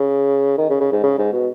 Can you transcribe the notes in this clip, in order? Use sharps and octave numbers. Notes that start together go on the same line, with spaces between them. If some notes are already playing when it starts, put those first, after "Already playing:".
Already playing: C#3
D#3
C#3
C#3
G#2
C#3
G#2
B2